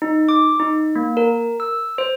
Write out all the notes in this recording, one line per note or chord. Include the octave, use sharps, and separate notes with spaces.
D#4
D6
D#4
A#3
A#4
E6
C5